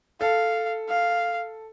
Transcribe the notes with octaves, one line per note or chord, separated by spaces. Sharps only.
A4 F5
F5